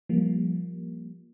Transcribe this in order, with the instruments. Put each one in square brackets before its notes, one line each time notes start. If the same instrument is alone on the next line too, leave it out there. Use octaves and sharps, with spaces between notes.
[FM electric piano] F3 G3 A#3